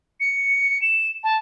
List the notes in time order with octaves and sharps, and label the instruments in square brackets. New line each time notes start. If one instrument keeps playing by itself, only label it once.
[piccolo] C#7
E7
A5